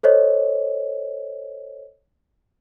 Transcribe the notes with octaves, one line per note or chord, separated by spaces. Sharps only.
A4 C5 C#5 D#5